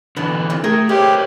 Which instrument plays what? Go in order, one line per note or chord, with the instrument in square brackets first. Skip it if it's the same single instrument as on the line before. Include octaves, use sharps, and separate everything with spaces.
[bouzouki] B2 B3 A5 [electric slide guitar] D3 E3
[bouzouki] C3 F4
[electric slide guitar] A3 [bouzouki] G#4 A#4 G5
[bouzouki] E4 [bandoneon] G4 [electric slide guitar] A#4 C5 C#5